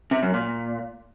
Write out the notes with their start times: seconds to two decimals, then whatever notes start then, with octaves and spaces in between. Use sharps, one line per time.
0.11 C3
0.23 F#2
0.34 A#2